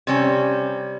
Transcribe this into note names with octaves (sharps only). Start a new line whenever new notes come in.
C3 G3 C#4